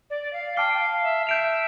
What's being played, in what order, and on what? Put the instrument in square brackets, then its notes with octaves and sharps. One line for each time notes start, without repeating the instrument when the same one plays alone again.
[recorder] D5
F5
[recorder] G5 [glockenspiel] A5 D6 F6 C7 G7
[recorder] G5
F5
E5
[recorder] E5 [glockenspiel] G6 D7 F7